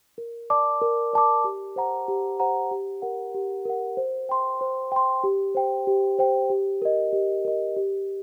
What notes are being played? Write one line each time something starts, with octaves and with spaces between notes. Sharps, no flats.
A#4
D5 A5 D6
A#4
D5 A5 D6
G4
C5 F#5 A#5
G4
C5 F#5 A#5
G4
A#4 F#5
G4
A#4 F#5
C5
G5 C6
C5
G5 C6
G4
C5 G5
G4
C5 G5
G4
A#4 D#5
G4
A#4 D#5
G4